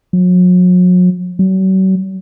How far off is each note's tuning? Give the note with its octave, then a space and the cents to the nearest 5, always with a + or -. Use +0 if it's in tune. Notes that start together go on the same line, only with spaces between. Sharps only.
F#3 -40
F#3 +40